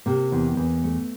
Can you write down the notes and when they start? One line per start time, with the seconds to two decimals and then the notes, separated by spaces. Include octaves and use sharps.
0.06 C3 A#3
0.32 E2
0.57 E2
0.84 A3